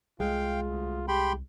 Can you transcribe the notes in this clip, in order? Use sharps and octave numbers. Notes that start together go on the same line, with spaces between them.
C2 G#3 F4 F5 G5
D2
G4 G5 B5 C6